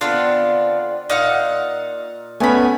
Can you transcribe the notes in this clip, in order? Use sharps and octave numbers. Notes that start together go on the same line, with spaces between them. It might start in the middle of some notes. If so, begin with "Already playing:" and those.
D3 B3 C4 D4 F4 F5
A#2 D#4 F5 F#5
A3 B3 C#4 G#5 B5